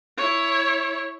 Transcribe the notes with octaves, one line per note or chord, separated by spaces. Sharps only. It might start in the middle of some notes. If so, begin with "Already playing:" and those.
E4 C#5